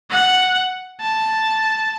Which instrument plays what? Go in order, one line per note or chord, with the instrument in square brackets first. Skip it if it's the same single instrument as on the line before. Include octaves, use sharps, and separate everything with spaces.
[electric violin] F#5
A5